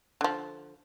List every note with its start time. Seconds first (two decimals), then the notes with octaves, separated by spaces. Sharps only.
0.21 D3 F3